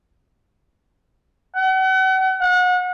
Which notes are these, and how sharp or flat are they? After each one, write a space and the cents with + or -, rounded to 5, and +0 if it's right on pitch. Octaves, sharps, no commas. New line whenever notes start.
F#5 +40
F#5 -35